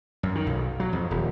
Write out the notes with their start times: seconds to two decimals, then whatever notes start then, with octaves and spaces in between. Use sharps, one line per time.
0.23 F#2
0.35 D#3
0.47 B1
0.80 F#3
0.93 F2
1.11 D#1